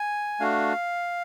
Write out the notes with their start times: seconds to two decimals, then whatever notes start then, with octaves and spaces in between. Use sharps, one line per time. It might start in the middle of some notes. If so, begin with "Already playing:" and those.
Already playing: G#5
0.40 A3 D4 F#4 F5